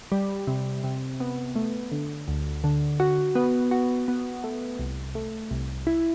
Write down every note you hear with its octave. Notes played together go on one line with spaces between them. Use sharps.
G3
C3
C3
B3
A3
D3
D2
D3
F#4
B3
F#4
B3
A3
C2
A3
C2
E4